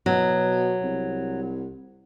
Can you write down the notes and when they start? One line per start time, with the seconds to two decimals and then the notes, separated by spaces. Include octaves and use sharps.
0.06 B2 F#3
0.83 C2